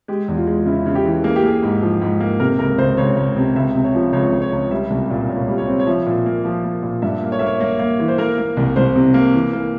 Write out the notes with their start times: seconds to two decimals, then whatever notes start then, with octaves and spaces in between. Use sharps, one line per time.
0.08 G#3 G4
0.28 E2
0.37 F4
0.47 G#3
0.66 C#3 E4
0.86 C#3
0.95 G4
1.05 E3
1.24 A#3 G#4
1.36 G4
1.43 A#3 G#4
1.63 G#2
1.82 F3
2.01 G#2
2.20 A#3
2.40 C3 A#4
2.59 C#2 A#4
2.78 C#2 C5
2.97 C#2 C#5
3.16 C#2
3.36 C3
3.55 C#2 E5
3.75 C3
3.84 C#5
3.95 F3
4.13 C#2 C#5
4.32 C#2
4.42 C#5
4.53 C#2
4.71 G3 E5
4.90 C2
5.10 A#2
5.29 A#2 C#5
5.48 G3
5.58 C#5
5.67 C4
5.80 C#5
5.87 F3 E5
6.06 A#2
6.26 A#3
6.45 F3
6.65 A#3
6.83 A#2
7.02 G2 E5
7.22 A#3
7.32 C#5
7.39 A#3 E5
7.46 C#5
7.60 A#3
7.79 A#3
8.00 E3
8.08 C5
8.18 A#3 A#4
8.38 A#3
8.57 C2
8.76 C2 C5
8.96 C3
9.14 A#3
9.33 E3
9.53 A#3